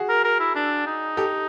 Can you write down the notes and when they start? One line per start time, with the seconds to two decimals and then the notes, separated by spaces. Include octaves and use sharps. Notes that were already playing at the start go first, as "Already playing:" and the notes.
Already playing: F#4 G#4
0.09 A#4
0.24 A#4
0.40 E4
0.56 D4
0.87 D#4
1.17 G4 A4